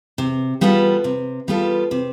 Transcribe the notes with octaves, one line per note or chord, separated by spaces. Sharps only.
C3
G3 B3 F4 A4
C3
G3 B3 F4 A4
C3